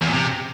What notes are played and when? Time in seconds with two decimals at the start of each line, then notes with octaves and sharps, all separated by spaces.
0.01 E2
0.07 A#2
0.13 C3